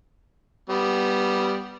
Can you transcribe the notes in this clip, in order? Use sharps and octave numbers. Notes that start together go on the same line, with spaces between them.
G3 B3